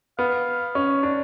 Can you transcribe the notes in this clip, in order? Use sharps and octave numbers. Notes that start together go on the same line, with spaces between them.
B3 F5
C#4
D4